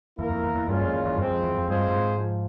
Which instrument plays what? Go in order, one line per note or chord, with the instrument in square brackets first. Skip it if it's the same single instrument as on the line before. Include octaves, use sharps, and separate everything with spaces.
[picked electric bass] E2 [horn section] A#3 E4 A#4
[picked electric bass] F2
E2
E2
[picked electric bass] G2 [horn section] A#2 G#3 C#4 F4
[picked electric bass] F2
E2
E2
G2
[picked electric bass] F2 [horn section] F3 G#3 C4
[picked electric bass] F2
E2
F2
[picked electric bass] G2 [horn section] G#3 C4 F4 G#4 C5
[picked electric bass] G2
G#2
[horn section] F3